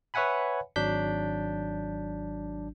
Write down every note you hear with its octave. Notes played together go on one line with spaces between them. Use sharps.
B4 C#5 E5 F#5 G#5 B5
G#1 F#3 D4 G6 B6